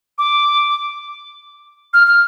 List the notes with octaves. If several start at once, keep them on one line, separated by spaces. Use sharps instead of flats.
D6
F6
F6